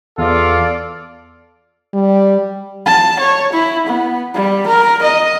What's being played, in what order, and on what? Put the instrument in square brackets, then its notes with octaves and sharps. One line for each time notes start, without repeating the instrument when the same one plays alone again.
[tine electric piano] E2 [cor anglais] F4 [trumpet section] A4 D5 F5
[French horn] G3
[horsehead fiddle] A5
C#5
E4
B3
G3
A#4
D#5